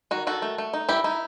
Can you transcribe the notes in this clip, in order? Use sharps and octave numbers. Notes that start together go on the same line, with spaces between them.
D#3 F#4
D#3 F#4 A4
A3
A3
D#4
E3 E4 G4
D#4 E4